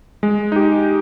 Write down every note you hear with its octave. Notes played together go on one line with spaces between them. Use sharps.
G#3
D#4 G4